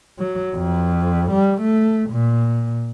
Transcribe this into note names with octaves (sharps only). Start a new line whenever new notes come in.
F#3
F2
G3
A3
A#2